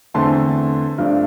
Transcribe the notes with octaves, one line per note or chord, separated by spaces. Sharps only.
E2 D3 A3 C4 A5 C6
G2 F3 A3 D4